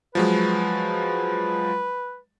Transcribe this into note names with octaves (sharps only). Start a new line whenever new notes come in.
F3 F#3 G#3 B4